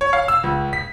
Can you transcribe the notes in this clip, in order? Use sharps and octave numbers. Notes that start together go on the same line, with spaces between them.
C#5
F5
E6
C#2
B6